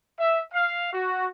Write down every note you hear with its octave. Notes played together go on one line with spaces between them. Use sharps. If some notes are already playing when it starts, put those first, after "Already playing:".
E5
F5
F#4